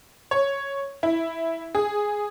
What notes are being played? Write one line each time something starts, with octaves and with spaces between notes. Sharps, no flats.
C#5
E4
G#4